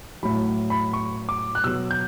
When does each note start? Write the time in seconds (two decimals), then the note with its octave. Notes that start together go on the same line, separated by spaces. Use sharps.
0.23 A2 F#3 B5
0.70 B5
0.93 C#6
1.29 D6
1.55 F#6
1.64 B2 F#3 E6
1.91 G6